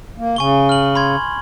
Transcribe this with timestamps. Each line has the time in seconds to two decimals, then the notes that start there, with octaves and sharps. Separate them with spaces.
0.17 A#3
0.36 C#3 G#5 C#6 G7
0.69 F6 F#7
0.95 B5 C6 G#6